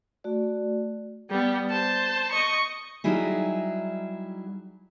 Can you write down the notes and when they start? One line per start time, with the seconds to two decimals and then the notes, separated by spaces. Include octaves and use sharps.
0.24 A3 F#4 D5
1.30 G3 B3
1.70 C5 A5
2.32 D#5 C#6
3.04 F#3 G3 D#4 E4 G#4